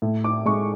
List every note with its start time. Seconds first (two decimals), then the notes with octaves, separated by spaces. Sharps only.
0.02 A2
0.24 D6
0.46 G#3 C#6